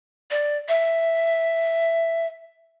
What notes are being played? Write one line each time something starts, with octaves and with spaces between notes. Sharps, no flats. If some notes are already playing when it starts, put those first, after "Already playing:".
D5
E5